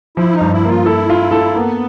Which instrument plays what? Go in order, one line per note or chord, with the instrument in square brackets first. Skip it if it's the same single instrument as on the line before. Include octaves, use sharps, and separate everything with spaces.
[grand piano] F3 [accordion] E4
[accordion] D#4
[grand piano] G2
[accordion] E4
[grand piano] A#3
[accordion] F4
[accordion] E4 [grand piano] A4
[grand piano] F4
A4
[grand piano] A#3 [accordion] B3